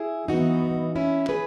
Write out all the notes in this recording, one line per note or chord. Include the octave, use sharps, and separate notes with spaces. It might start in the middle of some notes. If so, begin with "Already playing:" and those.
Already playing: E4 G#4
E3 B3 D#4 F#4
C#4 E4
G#4 B4